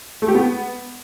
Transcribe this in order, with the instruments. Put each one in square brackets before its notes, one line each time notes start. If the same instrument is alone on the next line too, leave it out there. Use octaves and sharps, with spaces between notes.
[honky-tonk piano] A3
G4
B3